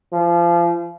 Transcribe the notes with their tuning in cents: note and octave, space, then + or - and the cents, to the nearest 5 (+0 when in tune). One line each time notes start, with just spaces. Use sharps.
F3 -30